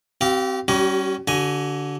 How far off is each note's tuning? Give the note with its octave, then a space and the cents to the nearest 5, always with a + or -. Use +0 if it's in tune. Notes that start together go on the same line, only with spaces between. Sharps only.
C4 +0 G4 -40 F5 +0
G3 -25 C#4 +0 F#4 +40
D3 -20 F#4 +30 G#5 +0